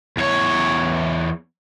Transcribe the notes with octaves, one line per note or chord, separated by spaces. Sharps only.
E2 C#5